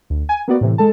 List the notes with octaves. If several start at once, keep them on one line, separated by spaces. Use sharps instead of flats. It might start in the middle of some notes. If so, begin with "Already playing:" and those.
D2
G#5
A#3 B3 F#4 D5
A2 C3 E3
G#3 A4 A5